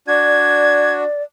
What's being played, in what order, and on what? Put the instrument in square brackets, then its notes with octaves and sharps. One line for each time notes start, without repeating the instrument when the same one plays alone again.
[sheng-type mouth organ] D4 F#4 [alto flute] D5 [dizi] G#6